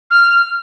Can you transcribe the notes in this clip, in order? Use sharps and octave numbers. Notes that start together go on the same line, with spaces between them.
F6